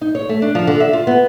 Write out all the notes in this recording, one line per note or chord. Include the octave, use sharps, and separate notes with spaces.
D#4
C#5
A3
D4
F3
D3
E5
F4
B3